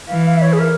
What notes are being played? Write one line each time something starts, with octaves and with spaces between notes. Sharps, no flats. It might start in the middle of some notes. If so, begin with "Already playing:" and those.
E3 F5
F5
E5
C#5
G#4
A#4